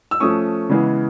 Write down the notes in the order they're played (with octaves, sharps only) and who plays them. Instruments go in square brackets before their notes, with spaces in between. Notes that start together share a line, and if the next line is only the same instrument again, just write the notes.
[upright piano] E6
F3 A3 C#4 C#6 D#6
C#3 E3 G#3 B3